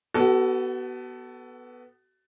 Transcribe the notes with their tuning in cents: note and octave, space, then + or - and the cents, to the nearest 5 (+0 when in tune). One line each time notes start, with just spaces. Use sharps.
B3 +0 F#4 +35 A4 +0